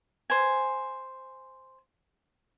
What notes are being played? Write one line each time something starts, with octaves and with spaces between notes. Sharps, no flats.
C5 G#5